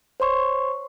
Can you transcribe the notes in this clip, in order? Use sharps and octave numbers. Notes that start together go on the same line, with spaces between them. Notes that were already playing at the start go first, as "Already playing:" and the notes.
C5 C#5 C6 C#6